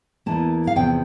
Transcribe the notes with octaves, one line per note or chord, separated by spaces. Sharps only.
E2 E3 A#3 A5
F5
E2 C3 F3 G5